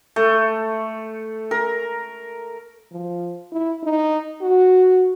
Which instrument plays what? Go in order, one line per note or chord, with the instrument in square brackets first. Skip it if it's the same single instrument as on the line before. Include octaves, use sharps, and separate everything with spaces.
[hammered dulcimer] A3
A#4
[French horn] F3
E4
D#4
F#4